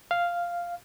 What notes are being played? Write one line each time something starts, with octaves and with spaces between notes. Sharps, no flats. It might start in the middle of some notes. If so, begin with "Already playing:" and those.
F5